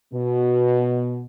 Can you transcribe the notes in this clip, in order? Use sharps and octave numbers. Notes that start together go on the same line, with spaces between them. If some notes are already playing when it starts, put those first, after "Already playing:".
B2